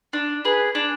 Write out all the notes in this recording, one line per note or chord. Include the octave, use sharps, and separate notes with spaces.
D4
G#4 B4
D4